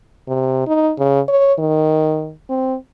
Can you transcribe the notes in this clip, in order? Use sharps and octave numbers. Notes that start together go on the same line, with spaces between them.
C3
D#4
C#3
C#5
D#3
C4